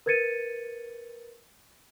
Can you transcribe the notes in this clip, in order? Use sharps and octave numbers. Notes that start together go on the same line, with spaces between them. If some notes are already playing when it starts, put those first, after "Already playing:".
A#4 B4 G#6 A6 C#7 D#7